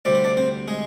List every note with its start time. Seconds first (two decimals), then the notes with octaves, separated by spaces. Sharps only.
0.05 D2 C3 G3 C4 D5
0.15 C5
0.24 D4 D5
0.37 C4 C5
0.68 G#3 G#4